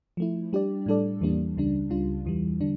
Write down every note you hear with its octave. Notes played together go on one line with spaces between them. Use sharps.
F3 A3 E4
G3 D4 G4 D5
A2 G3 D4 A4 D5
E2 E3 G3 A#3 D4
C#2 C#3 G3 D4
C#2 C#3 G3 D4 F4
E2 E3 G3
D3 G3 D4